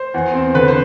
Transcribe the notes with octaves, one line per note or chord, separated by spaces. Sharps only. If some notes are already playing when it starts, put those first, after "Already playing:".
Already playing: C5
E2
C4
D3 B4
C5